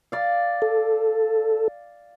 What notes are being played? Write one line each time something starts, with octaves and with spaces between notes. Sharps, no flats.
D5 F5
A4